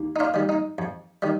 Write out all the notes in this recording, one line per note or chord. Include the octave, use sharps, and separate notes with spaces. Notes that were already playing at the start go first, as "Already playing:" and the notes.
Already playing: D#2
D#4
D4 F4
D#3 G3
D#4
F2
D#3 G3